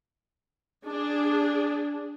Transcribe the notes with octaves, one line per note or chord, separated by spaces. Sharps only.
D4 G#4